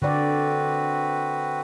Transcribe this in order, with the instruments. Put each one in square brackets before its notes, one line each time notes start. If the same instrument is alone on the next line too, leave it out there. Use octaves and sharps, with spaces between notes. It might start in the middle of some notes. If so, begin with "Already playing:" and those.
[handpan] D3 D5 [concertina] C4 F#4 B4